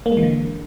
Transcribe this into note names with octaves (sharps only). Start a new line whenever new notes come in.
A#3
G#3
E3
D3